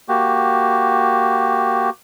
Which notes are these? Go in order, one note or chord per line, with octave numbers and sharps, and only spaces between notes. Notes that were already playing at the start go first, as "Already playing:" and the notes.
A#3 F#4 G4